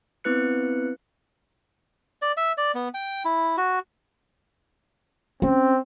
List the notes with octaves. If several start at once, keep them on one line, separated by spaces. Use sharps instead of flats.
B3 C4 E4 B4 F#6 C#7
D5
E5
D5
B3
G5
E4
F#4
C4 C#4